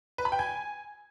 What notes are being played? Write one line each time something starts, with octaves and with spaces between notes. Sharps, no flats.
B4
B5
G5
G#5